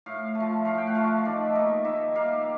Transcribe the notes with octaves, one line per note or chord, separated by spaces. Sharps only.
A2 F5
A3
F3
A2 F5
G5
F#5
F3 A3 F5
D#3 D5
E5
G3 A#3 D#5
D#3 E5
G3 A#3 F5